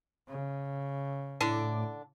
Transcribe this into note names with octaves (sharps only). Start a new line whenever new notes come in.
C#3
A2 D3 D4 E4 D6